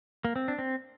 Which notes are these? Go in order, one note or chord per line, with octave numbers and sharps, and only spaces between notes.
A#3
C4
D4
C4